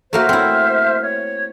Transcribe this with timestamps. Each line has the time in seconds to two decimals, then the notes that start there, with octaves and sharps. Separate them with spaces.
0.13 A3 A#3 F#4 C5 E5 F6
0.29 C4 E4
1.01 C#5